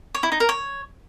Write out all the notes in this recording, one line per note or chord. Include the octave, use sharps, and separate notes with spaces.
C#5
E4
D#4
A#4
C#5